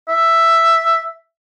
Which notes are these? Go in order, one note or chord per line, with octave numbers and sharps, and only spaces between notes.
E5